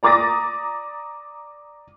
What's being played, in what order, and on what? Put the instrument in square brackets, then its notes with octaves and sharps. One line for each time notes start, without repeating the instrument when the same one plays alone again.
[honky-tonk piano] D5 A#5 D6 D#6 A6 A#6